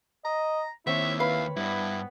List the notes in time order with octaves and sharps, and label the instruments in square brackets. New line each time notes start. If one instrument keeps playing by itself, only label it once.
[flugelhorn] D#5 [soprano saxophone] A#5
[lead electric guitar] D#2 [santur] C4 C#5 [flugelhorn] E4 [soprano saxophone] E5
[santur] B4 [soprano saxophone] F5
[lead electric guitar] G2 [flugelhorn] B3 [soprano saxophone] E4